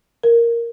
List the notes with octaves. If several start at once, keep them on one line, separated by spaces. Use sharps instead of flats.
A#4